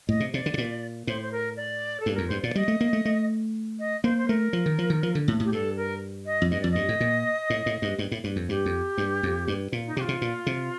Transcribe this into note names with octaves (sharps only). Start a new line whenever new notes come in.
A2 D#5
C3
C3 D5
D3
C3
A#2
A2 C5
C5
A#4
D5
A4
G2
F2 A#4
G2 C5
A#2 D5
G3 D#5
A3
A#3
A3
A3
D#5
A#3 C5
C5
A3 A#4
F3
D#3
F3
D#3
F3
D3
A2
A2 G4
G2 A4
A#4
D#5
F2
G2 D#5
F2 D5
G2 D#5
A2
A#2
A2
A2
G2
G2
A2
G2
F2
G2 G4
F2
G2
F2
G2
A#2
D#4
C3 G4
F4
C3
A#2
C3